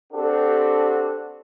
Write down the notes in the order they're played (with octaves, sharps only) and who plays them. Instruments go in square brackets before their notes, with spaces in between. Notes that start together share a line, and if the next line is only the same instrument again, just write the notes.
[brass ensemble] C4 D4 F#4 G4 A4